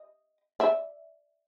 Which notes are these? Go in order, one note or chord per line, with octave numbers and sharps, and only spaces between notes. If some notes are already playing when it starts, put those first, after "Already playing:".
Already playing: D#5
D5 E5